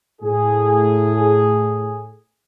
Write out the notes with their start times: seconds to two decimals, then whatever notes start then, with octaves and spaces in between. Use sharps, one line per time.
0.22 A2 G#4